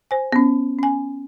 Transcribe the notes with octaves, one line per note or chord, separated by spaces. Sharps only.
C5 G#5
B3 C#4
C#4 G#5